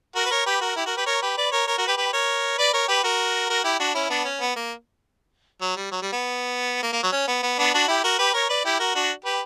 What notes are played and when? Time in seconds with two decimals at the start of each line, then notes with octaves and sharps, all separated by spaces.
0.15 F#4 A#4
0.25 B4
0.30 A#4 C#5
0.46 G4 B4
0.61 F#4 A#4
0.76 E4 G4
0.86 F#4 A#4
0.97 G4 B4
1.06 A#4 C#5
1.22 G4 B4
1.37 B4 D5
1.52 A#4 C#5
1.67 A#4 C#5
1.78 F#4 A#4
1.87 G4 B4
1.97 G4 B4
2.13 A#4 C#5
2.58 B4 D5
2.73 A#4 C#5
2.88 G4 B4
3.03 F#4 A#4
3.49 F#4 A#4
3.64 E4 G4
3.79 D4 F#4
3.94 C#4 E4
4.09 B3 D4
4.24 C#4
4.41 B3
4.56 A#3
5.61 F#3
5.76 G3
5.92 F#3
6.02 G3
6.13 B3
6.83 A#3
6.93 A#3
7.03 F#3
7.12 C#4
7.28 B3
7.43 B3
7.58 B3 D4
7.74 D4 F#4
7.88 E4 G4
8.04 F#4 A#4
8.18 G4 B4
8.34 A#4 C#5
8.49 B4 D5
8.65 E4 G4
8.79 F#4 A#4
8.95 D4 F#4
9.25 G4 B4